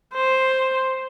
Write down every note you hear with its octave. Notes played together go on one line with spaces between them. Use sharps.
C5